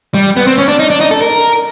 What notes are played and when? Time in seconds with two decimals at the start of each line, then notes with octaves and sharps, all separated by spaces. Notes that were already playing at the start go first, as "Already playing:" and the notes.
0.14 G3
0.37 B3
0.47 C4
0.58 C#4
0.68 D4
0.79 D#4
0.90 D4
1.01 D#4
1.11 A4
1.22 A#4